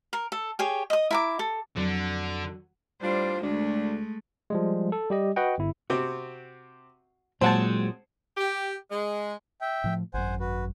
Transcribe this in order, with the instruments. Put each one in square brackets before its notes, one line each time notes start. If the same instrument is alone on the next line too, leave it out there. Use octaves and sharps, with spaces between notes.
[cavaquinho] A#4
A4
G4 G#4 C#5
D#5 D#6
E4 A#5 D6
A4
[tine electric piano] F2 [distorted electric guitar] D3 [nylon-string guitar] F#3
[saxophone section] A2 D4 F4 [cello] G3 C5
[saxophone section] D2 D4 [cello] G#3 A3
[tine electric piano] F3 G3 G#3
A4
G3 G4 D#5
F#4 B4 D#5 F#5 G5
G1 E4
[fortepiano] C3 C4 [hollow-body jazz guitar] F#4
[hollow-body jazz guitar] A#2 F#3 [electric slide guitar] G#3 C4 [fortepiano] C5 F#5 A5
[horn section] G4
G#3
[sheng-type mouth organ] E5 G5
[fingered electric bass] A2 F3
[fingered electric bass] G#1 F#2 [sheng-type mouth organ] C5 F#5 G#5
[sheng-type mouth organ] F#4 B4